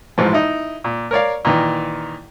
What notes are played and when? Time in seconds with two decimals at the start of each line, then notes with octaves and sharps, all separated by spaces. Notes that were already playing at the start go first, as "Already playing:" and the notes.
0.18 A1 G#2 E3 F3
0.34 D#4 E4
0.84 A#2
1.11 A#4 C#5 D5 F5
1.45 A#2 D#3 E3